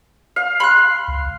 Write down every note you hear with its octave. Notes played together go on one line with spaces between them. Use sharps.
F5
B5 C6 F#6
C#2